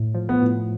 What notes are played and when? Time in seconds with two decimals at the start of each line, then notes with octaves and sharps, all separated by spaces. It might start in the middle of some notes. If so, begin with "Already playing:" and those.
Already playing: A2
0.15 F3
0.29 B3
0.42 A2